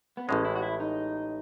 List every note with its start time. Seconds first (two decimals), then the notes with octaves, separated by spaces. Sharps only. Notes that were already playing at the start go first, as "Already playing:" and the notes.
0.17 B3
0.28 A1 A2 G#3 C#4
0.45 E4
0.56 F#4
0.62 E4
0.80 D#4